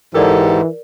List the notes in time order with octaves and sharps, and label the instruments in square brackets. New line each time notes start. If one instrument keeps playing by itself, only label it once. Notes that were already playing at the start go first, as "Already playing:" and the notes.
[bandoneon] G#2 [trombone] E3 [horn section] G4 A4 [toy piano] A#4 D5